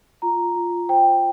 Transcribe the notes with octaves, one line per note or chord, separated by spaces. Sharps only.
F4 A#5
F4
C5 G5